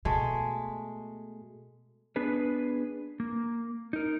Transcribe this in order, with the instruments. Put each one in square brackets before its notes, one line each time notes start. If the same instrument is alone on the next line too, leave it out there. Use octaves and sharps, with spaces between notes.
[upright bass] B2 [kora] G#3 A3
[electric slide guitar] B3 D4 G#4 B4
A#3
D#4 A#4